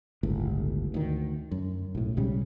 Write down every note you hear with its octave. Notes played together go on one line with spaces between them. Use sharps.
G1 C#2 A2
D2 D#3
F#2
B1 A2
B1 G#2 C#3 G3